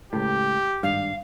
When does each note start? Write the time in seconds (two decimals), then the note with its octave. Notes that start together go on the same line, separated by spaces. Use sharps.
0.13 C#2 A2 G4
0.83 G#1 G2 F5